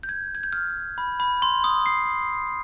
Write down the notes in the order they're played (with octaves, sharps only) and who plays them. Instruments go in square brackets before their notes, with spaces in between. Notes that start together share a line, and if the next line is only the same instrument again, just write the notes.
[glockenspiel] G6
G#6
G#6
G6
F6
B5
B5
C6
D#6
C7